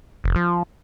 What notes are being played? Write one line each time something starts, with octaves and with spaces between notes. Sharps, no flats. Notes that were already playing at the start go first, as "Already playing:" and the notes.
F1
F3